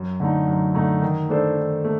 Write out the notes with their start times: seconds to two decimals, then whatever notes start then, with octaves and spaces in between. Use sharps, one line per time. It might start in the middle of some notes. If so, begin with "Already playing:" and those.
Already playing: F#2
0.20 D3 A3 D#4
0.48 F#2
0.75 D3 A3 D#4
1.02 D#3
1.29 A3 D4 A4 C5
1.57 D#3
1.84 A3